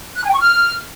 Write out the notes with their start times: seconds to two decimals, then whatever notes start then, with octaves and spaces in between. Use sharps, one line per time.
0.17 F#6
0.23 G#5
0.29 G5
0.34 C#6
0.40 F6